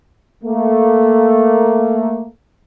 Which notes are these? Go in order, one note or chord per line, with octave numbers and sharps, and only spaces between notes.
A3 A#3